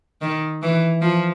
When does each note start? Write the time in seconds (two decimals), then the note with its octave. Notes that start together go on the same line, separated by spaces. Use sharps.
0.21 D#3
0.62 E3
1.02 F3